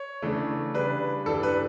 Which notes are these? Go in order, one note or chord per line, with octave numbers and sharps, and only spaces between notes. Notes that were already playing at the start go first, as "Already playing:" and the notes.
Already playing: C#5
C#3 E3 A3 D4
C#3 G3 D4 B4
G2 E3 G3 D4 A4
B4